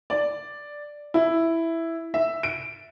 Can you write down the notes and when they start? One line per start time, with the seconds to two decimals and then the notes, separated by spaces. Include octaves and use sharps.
0.10 D5
1.14 E4
2.14 E5
2.43 D7